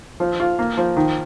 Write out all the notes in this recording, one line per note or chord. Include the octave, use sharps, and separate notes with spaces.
F3
F4
A#3
F3
D#3